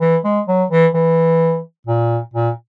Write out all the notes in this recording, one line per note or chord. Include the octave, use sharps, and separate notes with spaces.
E3
G#3
F#3
E3
E3
A#2
A#2